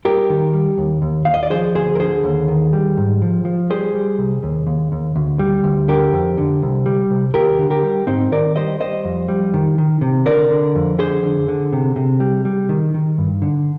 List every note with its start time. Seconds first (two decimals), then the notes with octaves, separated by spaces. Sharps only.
0.05 G3 G4 A#4
0.30 D#3
0.54 G3
0.78 D#2
1.02 D#2
1.25 D#2 F5
1.34 D#5
1.43 D5
1.50 F3 G#4 C5
1.75 D2 G#4 C5
1.95 A#4
2.00 D3 G#4 C5
2.24 D#2
2.48 D#3
2.73 G3
2.97 G#2
3.22 F3
3.45 F3
3.70 G3 G#4 C5
3.94 G3
4.19 C2
4.43 D#2
4.67 D#2
4.92 D#2
5.16 D2
5.39 G3
5.64 D2
5.88 D3 G4 A#4
6.13 F2
6.38 D3
6.62 C2
6.86 G3
7.11 C2
7.34 D#2 G4 A#4
7.59 D3
7.70 G4 A#4
7.83 G3
8.07 G#2 C4 D#4
8.32 D#3 A#4 D5
8.56 G3 C5 D#5
8.80 G3 C5 D#5
9.04 F2
9.28 G3
9.54 D#3
9.78 D#3
10.01 C3
10.26 D3 A#4 D5
10.50 D3
10.75 F2
10.99 D3 G#4 C5
11.23 D3
11.48 D3
11.73 C3
11.96 C3
12.20 G3
12.45 G3
12.69 D#3
12.94 D#3
13.18 G2
13.42 D3